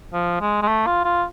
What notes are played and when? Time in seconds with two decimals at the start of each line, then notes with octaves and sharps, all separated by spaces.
0.13 F3
0.41 G#3
0.62 G#3
0.68 A3
0.87 F4
1.05 F4